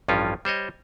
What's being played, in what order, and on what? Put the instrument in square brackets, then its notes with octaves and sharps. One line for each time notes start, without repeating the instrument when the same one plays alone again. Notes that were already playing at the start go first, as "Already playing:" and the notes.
[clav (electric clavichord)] A1 G2 F3 C#4 F4
G3 C5 C#5 D#5